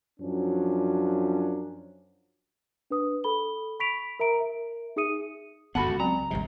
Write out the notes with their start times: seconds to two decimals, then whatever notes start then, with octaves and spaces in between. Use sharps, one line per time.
0.20 F#2 F3 F#3 C#4 D4
2.90 D4 B4 D#6
3.24 A4 B5 G7
3.80 B5 C#6 B6 D7 F7
4.20 A#4 E5 A#5 D7
4.40 A#4 E5
4.96 D#4 G#4 E5 D#6 C#7 D#7
5.75 G1 B3 F#4 A4 F#5 A5 B5
5.86 C#2
6.00 F#3 C4 A#5
6.31 G#1 D#2 C3 G3